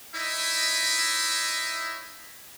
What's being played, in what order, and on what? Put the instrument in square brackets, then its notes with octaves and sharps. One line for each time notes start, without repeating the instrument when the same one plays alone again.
[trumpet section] D#4 E4 C#5 D#5 E5